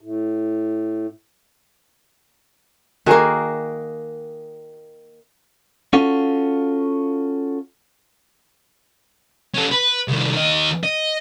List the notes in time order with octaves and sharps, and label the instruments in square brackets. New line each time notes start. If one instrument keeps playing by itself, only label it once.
[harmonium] A2
[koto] D#3 A#3 [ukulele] F#4 G#4 A#4
[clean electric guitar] C#4 F4 F#4 A4 F5
[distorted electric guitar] C#4 A4
B4
C2 D#3
D#2 D#5
D#5